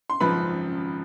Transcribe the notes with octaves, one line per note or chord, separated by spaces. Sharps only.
C6
G#1 F#2 C#3 F3 B4 B5